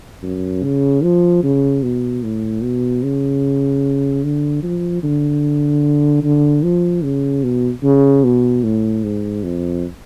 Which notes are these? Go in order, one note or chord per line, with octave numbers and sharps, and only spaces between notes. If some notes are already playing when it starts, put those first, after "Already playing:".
F#2
C#3
F3
C#3
B2
A2
B2
C#3
D3
F3
D3
D3
F3
C#3
B2
C#3
B2
A2
G#2
F2